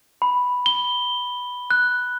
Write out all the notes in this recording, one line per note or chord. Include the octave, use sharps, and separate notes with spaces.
B5
G7
F#6